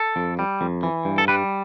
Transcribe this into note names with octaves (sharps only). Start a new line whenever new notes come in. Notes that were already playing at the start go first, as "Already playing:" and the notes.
Already playing: A4
F2
G3
F2
E3
G2
A4
G3 B4